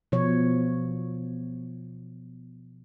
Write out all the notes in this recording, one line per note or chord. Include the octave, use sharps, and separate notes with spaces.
B2 F3 C#5